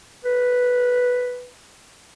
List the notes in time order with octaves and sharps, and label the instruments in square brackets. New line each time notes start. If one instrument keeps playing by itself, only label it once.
[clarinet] B4